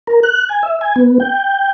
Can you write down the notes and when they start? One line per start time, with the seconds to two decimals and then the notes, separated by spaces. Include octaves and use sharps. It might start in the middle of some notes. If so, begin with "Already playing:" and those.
0.07 A#4
0.23 F#6
0.49 G#5
0.63 E5
0.81 G#5
0.96 B3
1.20 G5